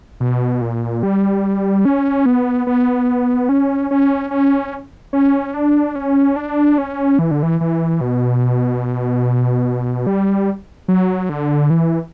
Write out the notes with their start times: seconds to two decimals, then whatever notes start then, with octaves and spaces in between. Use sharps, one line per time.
0.20 B2
0.61 A#2
1.03 G3
1.85 C#4
2.26 B3
2.67 B3
3.49 C#4
3.91 C#4
4.31 C#4
5.13 C#4
5.54 D4
5.95 C#4
6.36 D4
6.78 C#4
7.19 E3
7.31 D3
7.43 E3
7.61 E3
8.01 B2
10.07 G3
10.88 F#3
11.29 D3
11.70 E3